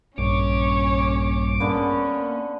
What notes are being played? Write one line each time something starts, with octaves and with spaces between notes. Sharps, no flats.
A#1 G2 C#4 C#5 D6
D3 A#3 B3 C#4